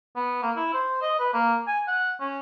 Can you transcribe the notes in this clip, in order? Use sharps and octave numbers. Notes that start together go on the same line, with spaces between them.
B3
A#3
E4
C5
D#5
B4
A#3
G#5
F#5
C#4